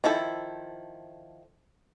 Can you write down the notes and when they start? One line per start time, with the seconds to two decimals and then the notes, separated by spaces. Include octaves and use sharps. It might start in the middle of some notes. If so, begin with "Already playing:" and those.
0.04 D#3 F3 E4 A4